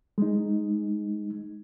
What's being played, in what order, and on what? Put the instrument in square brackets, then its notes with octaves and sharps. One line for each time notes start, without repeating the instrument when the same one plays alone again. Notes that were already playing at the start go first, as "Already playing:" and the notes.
[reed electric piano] G#3 D#4